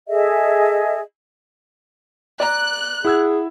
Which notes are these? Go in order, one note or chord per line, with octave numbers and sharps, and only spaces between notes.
G#4 A4 D#5 E5
D5 A#5 F#6
E4 G#4 F#5 E6 G#6